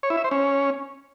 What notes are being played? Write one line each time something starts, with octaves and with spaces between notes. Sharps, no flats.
C#5
E4
E5
C5
C#4